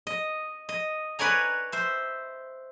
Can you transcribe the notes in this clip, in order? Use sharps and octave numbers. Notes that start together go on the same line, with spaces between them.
D#5
D#5
B4 C#5 D5 G#5 A#5
C5 E5